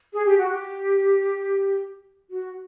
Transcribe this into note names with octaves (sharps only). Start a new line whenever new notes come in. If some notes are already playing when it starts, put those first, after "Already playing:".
G#4
G4
F#4
G4
F#4